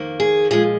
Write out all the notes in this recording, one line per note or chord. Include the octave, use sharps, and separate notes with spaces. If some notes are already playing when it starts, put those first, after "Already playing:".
Already playing: F2 D#3 A#3
G#4
A#2 F3 G#3 G#4